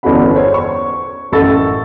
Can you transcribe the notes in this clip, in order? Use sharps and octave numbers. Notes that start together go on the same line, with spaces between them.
G1 E2 C#4 F#4 F#5 B5
C5 C#5
C#6
A1 F#2 A4 C#6 A6